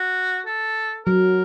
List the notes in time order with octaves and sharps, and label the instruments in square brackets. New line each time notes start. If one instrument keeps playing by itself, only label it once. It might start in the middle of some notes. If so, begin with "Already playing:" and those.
Already playing: [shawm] F#4
A4
[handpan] F#3 [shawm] A#4